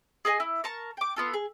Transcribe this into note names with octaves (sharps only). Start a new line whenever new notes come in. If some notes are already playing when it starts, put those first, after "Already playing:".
G#4 A4 D#5 G#5
E4
A#4 A5 C#6
G5 D6
B3 F4 A4
G#4